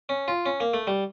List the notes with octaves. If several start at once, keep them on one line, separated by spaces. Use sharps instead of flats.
C#4
F4
C#4
A#3
A3
G3